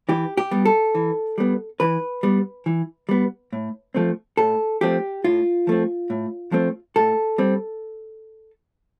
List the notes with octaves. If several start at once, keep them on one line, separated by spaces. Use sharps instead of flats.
E3 G4
G4
G3 B3
A4
E3
G3 B3
E3 B4
G3 B3
E3
G3 B3
A2
F3 A3 C4
A2 A4
F3 A3 C4 G4
A2 F4
F3 A3 C4
A2
F3 A3 C4
A2 A4
G3 C4